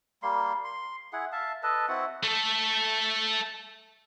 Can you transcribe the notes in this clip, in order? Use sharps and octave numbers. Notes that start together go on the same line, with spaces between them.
G3 A#3 C6
C6
E4 G#4 F#5
E5 F5 A5
A4 B4 D#5 A5
C4 E4 F#4 F#5
A3 A4